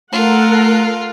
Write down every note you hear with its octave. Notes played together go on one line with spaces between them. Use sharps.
A3 F4 A4 A#4 F#5